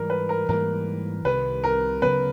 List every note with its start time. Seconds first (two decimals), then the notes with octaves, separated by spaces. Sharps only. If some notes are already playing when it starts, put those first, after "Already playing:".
Already playing: G#2 E3 G3 A#4
0.10 B4
0.29 A#4
0.49 G#2 E3 G3 A#3 A#4
1.25 C2 C3 D#3 B4
1.64 A#4
2.02 D2 C#3 F#3 B3 B4